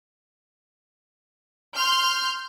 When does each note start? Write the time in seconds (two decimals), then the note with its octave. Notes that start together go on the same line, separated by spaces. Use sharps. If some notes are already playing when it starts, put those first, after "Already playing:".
1.76 C6 F6 G6